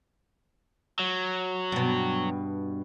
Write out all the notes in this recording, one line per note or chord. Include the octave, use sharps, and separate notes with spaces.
F#3
G2 B2